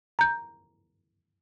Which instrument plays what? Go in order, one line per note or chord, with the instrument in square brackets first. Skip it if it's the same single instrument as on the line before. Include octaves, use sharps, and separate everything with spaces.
[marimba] A#5 G6